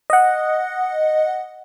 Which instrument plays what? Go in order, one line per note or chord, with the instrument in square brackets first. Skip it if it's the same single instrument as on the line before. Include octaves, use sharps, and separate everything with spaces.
[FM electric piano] D#5 F#5